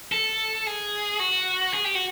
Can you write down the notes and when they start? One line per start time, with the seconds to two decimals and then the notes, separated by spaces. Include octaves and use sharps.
0.12 A4
0.67 G#4
1.20 F#4
1.74 G#4
1.84 G4
1.95 F#4